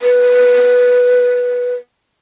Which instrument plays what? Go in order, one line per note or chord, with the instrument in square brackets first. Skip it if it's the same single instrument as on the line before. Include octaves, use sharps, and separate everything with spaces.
[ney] B4